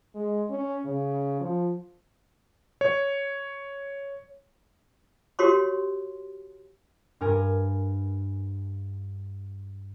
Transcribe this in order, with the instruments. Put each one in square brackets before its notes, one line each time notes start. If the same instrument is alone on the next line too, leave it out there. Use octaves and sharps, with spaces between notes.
[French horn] G#3
C#4
C#3
F3
[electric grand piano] C#5
[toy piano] F#4 G4 A#4 C#5 C6 C#6
[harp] G2 A#4 G#5